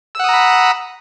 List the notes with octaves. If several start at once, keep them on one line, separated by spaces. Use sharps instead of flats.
F#5 A#5 B5 D#6 E6